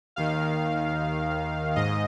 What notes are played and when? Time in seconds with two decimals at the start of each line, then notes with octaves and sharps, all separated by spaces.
0.16 D#2 D#3 F5
1.76 G#2 D#5